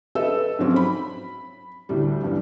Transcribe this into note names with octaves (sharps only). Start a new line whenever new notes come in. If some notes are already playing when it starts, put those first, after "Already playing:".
A4 B4 D#5 E5 A5 E6
G#2 F3 F#3 C4 C#4
B5
D2 A2 G3
G2 E3